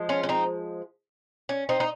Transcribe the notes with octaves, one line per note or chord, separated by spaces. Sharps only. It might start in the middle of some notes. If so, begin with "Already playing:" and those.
Already playing: F3 G#3
C#4 F4
C#4
C4 D#4
C#4
C4 D#4
D#4